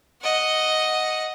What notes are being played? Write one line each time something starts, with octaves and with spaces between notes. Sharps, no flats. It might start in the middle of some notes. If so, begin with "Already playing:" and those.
D#5 F#5